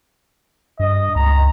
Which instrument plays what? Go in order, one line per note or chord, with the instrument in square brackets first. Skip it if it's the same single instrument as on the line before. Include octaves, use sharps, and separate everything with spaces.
[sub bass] G2 [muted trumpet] D#5
[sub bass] C#2 [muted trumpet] A#5